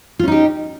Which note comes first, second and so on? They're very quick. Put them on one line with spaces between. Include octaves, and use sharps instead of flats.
F4 C#4 D#4 G4